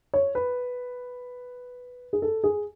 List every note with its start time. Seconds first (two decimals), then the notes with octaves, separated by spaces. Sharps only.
0.14 C#5
0.35 B4
2.13 G#4
2.22 A4
2.44 G#4